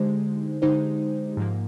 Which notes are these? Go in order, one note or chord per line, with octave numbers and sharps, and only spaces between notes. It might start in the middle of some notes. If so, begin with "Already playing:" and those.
Already playing: D3 G#3 D#4 G4 C5
D3 G#3 D#4 G4 C5
G#2 F3 A#3